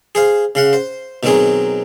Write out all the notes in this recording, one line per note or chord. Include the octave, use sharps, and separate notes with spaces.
G#4 C5 F5
C#3 F5 F#5
C5
B2 D#3 F#3 C4 G#4